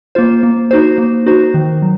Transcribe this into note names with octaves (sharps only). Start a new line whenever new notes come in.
A#3 F4 C5
A#3
D#4 F#4 C5
A#3
D#4 F#4 C5
D#3
F#3